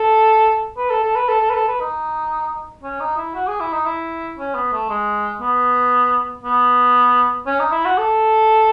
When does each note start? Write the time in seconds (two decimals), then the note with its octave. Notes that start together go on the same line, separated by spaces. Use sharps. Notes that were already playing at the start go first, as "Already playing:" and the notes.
Already playing: A4
0.77 B4
0.90 A4
1.03 A4
1.16 B4
1.29 A4
1.41 A4
1.50 B4
1.54 A4
1.68 B4
1.80 D#4
2.83 C#4
3.00 D#4
3.17 E4
3.35 F#4
3.47 G#4
3.60 E4
3.73 D#4
3.86 E4
4.37 C#4
4.55 B3
4.73 A3
4.89 G#3
5.41 B3
6.43 B3
7.46 C#4
7.59 D#4
7.72 E4
7.85 F#4
7.98 A4